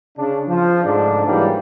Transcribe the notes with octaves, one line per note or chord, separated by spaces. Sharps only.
C#3 D4
F3
G#2 C#3 A3 D4
G#2 E3 F#3 G3 A#3